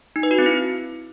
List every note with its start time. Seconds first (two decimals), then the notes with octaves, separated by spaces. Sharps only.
0.16 D#4
0.23 B4
0.31 F#4
0.38 C4
0.46 E4